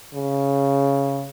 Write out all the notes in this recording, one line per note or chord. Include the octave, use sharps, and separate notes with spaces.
C#3